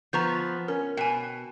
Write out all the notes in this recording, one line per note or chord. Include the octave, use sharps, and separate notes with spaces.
F3 B3 A#5 C#6 G6
C#4 A#4
B2 G5 G#5